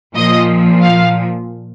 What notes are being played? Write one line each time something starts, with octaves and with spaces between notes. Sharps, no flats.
A#2 F3 D#5
F5